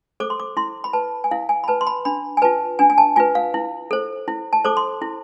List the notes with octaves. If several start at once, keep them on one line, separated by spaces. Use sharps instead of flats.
A4 C5 D6
C6
D6
E4 C6
B5
B4 A5
G#5
E4 F5
G#5
B5
B4 A5
C6
B5
D4 B5
G#5
F4 B4 A5
D4 G#5
G#5
A5
F4 B4 G#5
F5
E4
A4 C5
E4
A5
A4 C5 D6
C6
E4